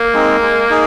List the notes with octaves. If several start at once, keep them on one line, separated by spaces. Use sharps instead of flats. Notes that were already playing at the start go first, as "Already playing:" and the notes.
Already playing: A#3
G#3 C4 D#4
G#3
D#4 G#4